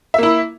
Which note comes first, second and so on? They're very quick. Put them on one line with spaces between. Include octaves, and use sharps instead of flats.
E5 A#3 E4